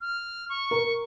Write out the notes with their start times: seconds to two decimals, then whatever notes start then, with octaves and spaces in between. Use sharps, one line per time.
0.01 F6
0.50 C#6
0.71 A#4